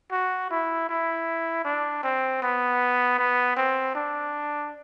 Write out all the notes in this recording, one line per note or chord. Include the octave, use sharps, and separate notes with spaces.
F#4
E4
E4
D4
C4
B3
B3
C4
D4